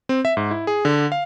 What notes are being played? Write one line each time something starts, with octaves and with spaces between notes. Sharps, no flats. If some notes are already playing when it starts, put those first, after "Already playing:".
C4
E5
G#2
E4
G#4
D3
F5